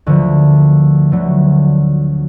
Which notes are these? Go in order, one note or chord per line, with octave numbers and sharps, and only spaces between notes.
D2 D3 F3
D2 D3 F#3 A3